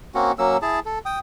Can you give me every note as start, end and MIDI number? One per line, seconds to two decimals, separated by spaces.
0.15 0.32 58
0.15 0.32 60
0.15 0.32 61
0.15 0.32 66
0.39 0.57 54
0.39 0.57 58
0.39 0.57 61
0.39 0.57 88
0.62 0.79 64
0.62 0.79 68
0.62 0.79 81
0.86 0.99 69
1.06 1.19 79
1.06 1.19 87